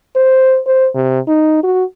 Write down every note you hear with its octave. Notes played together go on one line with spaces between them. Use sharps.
C5
C5
C3
D#4
F#4